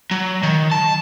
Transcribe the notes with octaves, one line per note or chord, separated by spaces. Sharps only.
F#3
D#3
A5